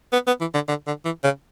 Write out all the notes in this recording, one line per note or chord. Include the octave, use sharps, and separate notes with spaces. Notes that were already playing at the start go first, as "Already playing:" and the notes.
B3
B3
E3
D3
D3
D3
E3
C#3